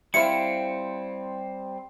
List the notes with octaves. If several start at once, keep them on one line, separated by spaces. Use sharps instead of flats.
G3 C4 E4 C5 F5 C#7